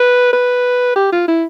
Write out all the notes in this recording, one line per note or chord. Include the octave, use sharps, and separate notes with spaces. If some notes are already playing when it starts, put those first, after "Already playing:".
Already playing: B4
B4
G4
F4
E4